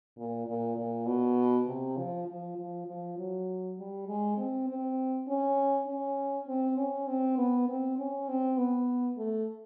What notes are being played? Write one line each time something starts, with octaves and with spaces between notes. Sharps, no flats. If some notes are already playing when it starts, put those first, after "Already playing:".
A#2
A#2
A#2
B2
C3
F3
F3
F3
F3
F#3
G3
G#3
C4
C4
C#4
C#4
C4
C#4
C4
B3
C4
C#4
C4
B3
A3